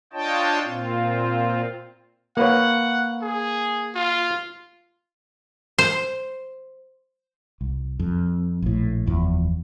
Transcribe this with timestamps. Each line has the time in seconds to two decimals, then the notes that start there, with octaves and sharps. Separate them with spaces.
0.13 D4 F4 C#5 D#5 G5 A5
0.64 A#2 C4 F4
2.37 A#3 B4 C#5 F#5
3.22 G#4
3.95 F4
5.79 C5
7.61 C2
7.99 F2
8.62 A#1 A2
9.06 F#1 E2 F3